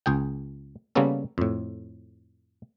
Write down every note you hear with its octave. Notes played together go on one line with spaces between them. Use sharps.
C#2 G#4 G5
C#3 G3 A#3 B3 C#4 A4
F2 A2